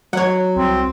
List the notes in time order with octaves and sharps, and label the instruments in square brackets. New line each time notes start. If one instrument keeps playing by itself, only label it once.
[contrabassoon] F#3 [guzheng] C#5 F#5
[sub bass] C2 [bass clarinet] C4